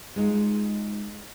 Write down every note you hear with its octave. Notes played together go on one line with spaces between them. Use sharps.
G#3 D#4 F4